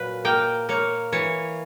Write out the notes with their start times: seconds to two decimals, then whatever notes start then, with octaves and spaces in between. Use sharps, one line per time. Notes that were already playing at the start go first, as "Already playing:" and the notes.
Already playing: A#2 F#3 B4
0.25 A#3 G5
0.69 A#3 C#5
1.12 E3 C#5